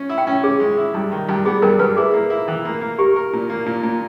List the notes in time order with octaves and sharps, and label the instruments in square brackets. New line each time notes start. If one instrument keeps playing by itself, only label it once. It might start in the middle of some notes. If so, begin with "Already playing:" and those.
Already playing: [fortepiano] C#4
E4
[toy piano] G5
[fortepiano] C#4
[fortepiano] C#4 [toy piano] G#4
[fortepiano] G#3
E4
G2
D#3
G2
[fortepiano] B3 [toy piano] G#4
[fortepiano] G2 [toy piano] A#4
[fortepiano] G2 [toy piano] B4
[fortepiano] E4 [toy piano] G#4
[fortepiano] A#3
E4
E3
A#3
A#3
[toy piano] G4 [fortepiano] A#4
[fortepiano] A#4
A#2
A#3
A#2
A#2